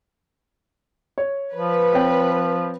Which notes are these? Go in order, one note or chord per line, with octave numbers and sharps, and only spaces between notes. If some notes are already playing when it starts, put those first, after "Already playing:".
C#5
F3 B4
C4 C#5 G5